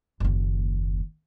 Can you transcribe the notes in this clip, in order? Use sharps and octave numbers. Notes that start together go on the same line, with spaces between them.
F#1 D#2